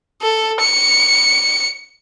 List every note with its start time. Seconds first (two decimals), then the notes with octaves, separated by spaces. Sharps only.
0.22 A4
0.60 C#7